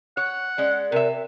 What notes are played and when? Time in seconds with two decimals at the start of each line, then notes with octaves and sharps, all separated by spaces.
0.17 C#5 F#5
0.58 G#3 C#4 D5
0.92 C3 A#4 E5